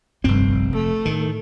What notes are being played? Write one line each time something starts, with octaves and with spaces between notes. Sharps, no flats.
F1 A#1 G2 C4
F3 A3
A2 D#3